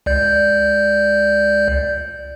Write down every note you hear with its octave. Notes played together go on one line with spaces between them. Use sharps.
C#2 D5 G6